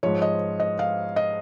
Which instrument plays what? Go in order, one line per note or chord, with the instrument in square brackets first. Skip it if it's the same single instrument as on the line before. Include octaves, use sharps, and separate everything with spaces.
[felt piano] G#2 F3 C#5
D#5
D#5
F5
D#5